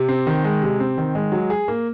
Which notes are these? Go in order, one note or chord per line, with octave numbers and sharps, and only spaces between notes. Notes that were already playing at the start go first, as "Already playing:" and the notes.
Already playing: C3
C4
D#3
G#3
C3
C4
D#3
G#3
F#3
G#4
A#3